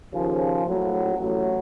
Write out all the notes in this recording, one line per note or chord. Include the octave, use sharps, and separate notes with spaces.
D#2 C#3 F3
A#1 A2 F#3
A1 A2 F#3